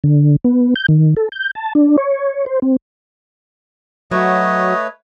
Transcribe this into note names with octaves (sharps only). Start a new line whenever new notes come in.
D3
B3
G6
D#3
A4
G6
A5
D4
C#5
C5
C4
F#3 A3 F#4 B4 C#5 D#5